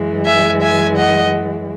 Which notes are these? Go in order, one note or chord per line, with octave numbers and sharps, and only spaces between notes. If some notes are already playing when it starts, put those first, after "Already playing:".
Already playing: F#2 E3 G#3
E5 G#5
E5 G#5
D#5 F#5